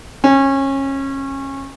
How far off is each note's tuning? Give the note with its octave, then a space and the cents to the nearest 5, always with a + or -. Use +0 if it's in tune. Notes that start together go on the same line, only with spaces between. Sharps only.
C#4 -25